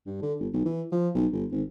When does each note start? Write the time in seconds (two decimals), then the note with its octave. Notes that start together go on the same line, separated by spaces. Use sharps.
0.06 G2
0.22 D3
0.40 G1
0.53 B1
0.65 E3
0.92 F3
1.15 B1
1.32 G1
1.52 G#1